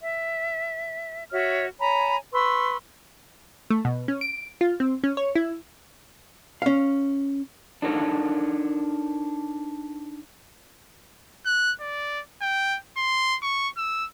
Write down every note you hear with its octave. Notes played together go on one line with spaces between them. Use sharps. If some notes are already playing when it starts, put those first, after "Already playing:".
E5
F#4 C#5 E5 F6
C#5 G#5 A#5 B5
B4 C6 C#6 E6
A3
B2
C#4
D7
F4
C4
C#4
C#5
E4
C#4 F5
D4 D#4 A4 A#4 C#5
F#6
D5
G5
C6
C#6
E6